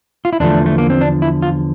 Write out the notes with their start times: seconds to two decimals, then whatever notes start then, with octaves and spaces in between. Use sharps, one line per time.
0.25 F4
0.33 E4
0.40 E2 D3 F3 A3 D4
0.66 A3
0.78 A#3
0.90 C4
1.01 D4
1.22 E4
1.42 F4